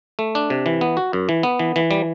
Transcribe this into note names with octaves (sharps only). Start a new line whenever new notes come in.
A3
D4
C3
E3
B3
F#4
F#2
E3
B3
E3
E3
G3